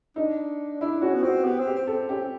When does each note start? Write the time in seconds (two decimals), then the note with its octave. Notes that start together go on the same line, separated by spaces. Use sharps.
0.16 D4 D#4
0.81 D4 E4
1.02 C#4 F#4
1.14 B3
1.23 C4 F#4
1.44 B3 G4
1.60 C4
1.66 G4
1.76 C4
1.87 A4
1.93 C4
2.09 C#4 G4
2.19 C4